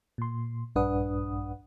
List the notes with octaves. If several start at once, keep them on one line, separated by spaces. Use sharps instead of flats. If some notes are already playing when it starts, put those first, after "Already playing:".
A#2 C6
A#1 G2 D4 B4 F#5 D#6